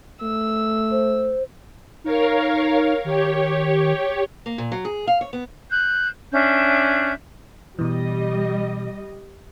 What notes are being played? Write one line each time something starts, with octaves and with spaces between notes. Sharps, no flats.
A3 E6
C5
D#4 A#4 C#5 F5
D#3 G4 C#5
A#3
A#2
F#3
G#4
F5
C#5
B3
F#6 G6
C#4 D4 E5 G6
B2 E3 G3 D#5